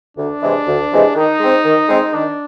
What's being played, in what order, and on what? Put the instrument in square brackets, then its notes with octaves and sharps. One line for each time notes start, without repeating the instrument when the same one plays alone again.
[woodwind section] D2 [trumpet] D4
[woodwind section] C3 E3 G#3
D2
C3 E3 G#3
[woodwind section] D#3 [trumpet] D#4
[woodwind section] G#3 C4
D#3
G#3 C4
[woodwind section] D#3 [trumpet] D4